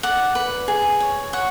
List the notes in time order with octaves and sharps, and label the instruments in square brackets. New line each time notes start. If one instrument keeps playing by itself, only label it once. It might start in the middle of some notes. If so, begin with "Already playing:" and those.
[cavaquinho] D5 F#5
B4
G#4
C#5
C#5 F#5